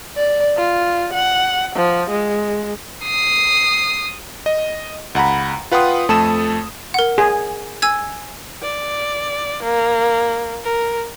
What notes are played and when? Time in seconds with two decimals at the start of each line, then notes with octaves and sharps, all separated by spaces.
0.17 D5
0.57 F4
1.14 F#5
1.76 F3
2.10 G#3
3.05 D#6 C7
4.46 D#5
5.15 C#2 F#5 A#5 B5
5.72 F4 B4 F#5 G5 C6 D#6
6.09 F2 A3 A4 A5 D#6 E7
6.94 A#4 F#5
7.18 G#4
7.82 G#5 E6 G#6
8.63 D5
9.63 A#3
10.64 A#4